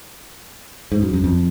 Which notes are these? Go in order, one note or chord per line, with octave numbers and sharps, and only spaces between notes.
G#2
F#2
F#2
F2